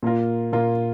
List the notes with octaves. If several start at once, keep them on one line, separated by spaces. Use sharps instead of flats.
A#2 A#3 F4 A#4
A#2 A#3 F4 A#4